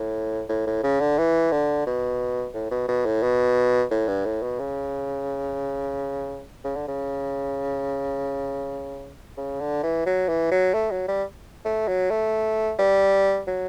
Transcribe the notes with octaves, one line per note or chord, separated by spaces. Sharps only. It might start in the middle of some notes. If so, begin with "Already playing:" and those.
Already playing: A2
A2
A2
C#3
D3
E3
D3
B2
A2
B2
B2
A2
B2
A2
G2
A2
B2
C#3
C#3
D3
C#3
C#3
D3
E3
F#3
E3
F#3
A3
F#3
G3
A3
F#3
A3
G3
F#3